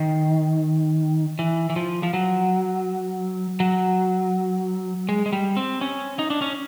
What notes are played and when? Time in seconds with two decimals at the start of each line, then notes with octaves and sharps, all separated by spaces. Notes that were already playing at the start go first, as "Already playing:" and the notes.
Already playing: D#3
1.39 E3
1.70 E3
1.76 F3
2.03 F3
2.14 F#3
3.60 F#3
5.09 G#3
5.26 G#3
5.33 G3
5.57 C4
5.81 C#4
6.19 D#4
6.30 D4
6.42 C#4